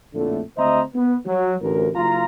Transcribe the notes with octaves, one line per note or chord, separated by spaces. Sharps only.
A#1 F2 A2 D3 A3
D2 C4 C5 D#5 E5 A#5
B3
F#3
A1 D2 A#4
F#1 F4 A#5